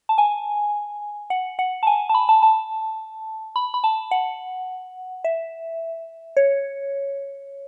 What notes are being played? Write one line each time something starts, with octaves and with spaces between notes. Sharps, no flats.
A5
G#5
F#5
F#5
A5
G#5
A5
B5
A5
A5
B5
B5
A5
F#5
E5
C#5